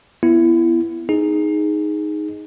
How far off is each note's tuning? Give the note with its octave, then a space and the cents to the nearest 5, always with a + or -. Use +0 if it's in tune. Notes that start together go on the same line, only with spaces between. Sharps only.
B3 +0 E4 +25
D#4 +0 G#4 +0